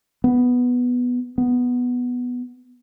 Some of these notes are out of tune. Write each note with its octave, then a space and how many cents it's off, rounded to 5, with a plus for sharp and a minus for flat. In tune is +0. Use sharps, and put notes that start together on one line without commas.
B3 +0
B3 +0